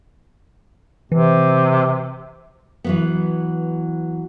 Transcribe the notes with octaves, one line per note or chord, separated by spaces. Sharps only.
C3 E3
E3 F#3 B3